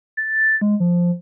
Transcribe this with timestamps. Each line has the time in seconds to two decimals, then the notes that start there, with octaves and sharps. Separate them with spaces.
0.17 A6
0.61 G#3
0.80 F3